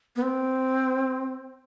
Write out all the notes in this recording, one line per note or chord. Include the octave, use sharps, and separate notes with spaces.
B3
C4